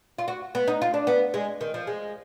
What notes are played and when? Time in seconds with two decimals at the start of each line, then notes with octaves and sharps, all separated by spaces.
0.18 F4
0.28 F#4
0.55 B3
0.68 D#4
0.82 F4
0.94 D4
1.07 B3
1.34 G#3
1.61 D#3
1.74 F3
1.87 G#3